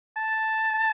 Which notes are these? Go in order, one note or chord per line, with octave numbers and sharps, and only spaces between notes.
A5